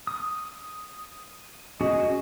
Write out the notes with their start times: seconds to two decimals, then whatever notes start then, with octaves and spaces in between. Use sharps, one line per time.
0.07 D#6
1.81 C#4 F#4 G#4 D#5